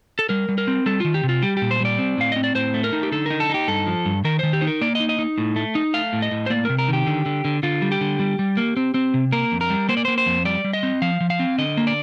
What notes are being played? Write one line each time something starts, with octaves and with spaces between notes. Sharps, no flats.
A4
G3 A#4
G3
A#4
C4
G3 A4
D#3 F4
G4
C3
F4
G3 G4
A#2 G4
C5
G3 D5
C4
A2 F5
C4 D#5
D5
A2 C5
A3
A#4
D#4
G4
D3 A4
D#4 A#4
A4
D#4 G4
G2 A4
F3
G2
D#3 A#4
D#3 C5
G4
D#4 C5
A#4
A#3 D5
D#4 D#5
D#5
D#4
A2
A3
D#4
A3 F5
A2
D#5
A2
C5
A#3 D5
C3 A#4
A#4
D#3 G4
D3
D3
D3
D3 F4
G3
G4
D3
G3
G3
A#3
C4
C4
C3
A#3 A#4
F2
A#4
G3
A#3 C5
D5
A#3 C5
C5
F2
G3 D5
G3
D#5
C4
F3 F5
F3
F5
C4
D3 D#5
A#3
D5